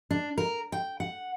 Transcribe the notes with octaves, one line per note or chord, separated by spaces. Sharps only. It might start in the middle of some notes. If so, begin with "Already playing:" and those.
D4
A#4
G5
F#5